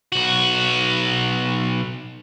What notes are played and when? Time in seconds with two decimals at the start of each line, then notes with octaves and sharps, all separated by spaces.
0.12 B1 F#4